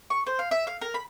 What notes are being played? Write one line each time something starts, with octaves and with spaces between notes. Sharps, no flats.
C#6
C5
F5
E5
F5
A#4
B5